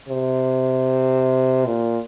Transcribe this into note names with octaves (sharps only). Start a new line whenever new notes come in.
C3
A#2